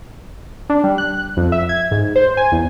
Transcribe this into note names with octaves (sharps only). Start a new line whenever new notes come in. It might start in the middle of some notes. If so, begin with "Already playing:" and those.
D4
G3
F#6
F2
E5
G#6
G#2
C5
G#5
E2